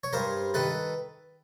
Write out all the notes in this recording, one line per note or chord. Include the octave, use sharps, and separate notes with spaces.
C#5
G2 A#4 C5
D#3 A4 B4